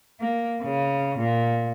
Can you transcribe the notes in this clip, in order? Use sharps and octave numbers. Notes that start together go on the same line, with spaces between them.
A#3
C#3
A#2